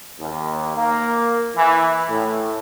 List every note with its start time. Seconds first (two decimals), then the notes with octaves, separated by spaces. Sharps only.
0.20 D#2
0.76 A#3
1.56 E3
2.08 A2